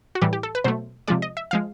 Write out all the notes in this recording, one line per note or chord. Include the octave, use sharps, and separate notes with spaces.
F#4
A2 E3 G3 G4
G4
A4
B4
B2 F#3 A3 C5
C3 F3 G#3 D5
D#5
E5
F3 G#3 F5